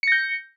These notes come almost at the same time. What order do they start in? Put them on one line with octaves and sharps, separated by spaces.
C#7 A#6 G6